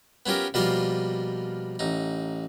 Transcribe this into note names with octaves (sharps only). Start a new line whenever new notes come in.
B3 C#4 F4 G4 A#4
B2 F3 G3 A#3 F4 F5
A1 D#4